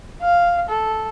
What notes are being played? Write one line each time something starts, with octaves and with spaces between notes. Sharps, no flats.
F5
A4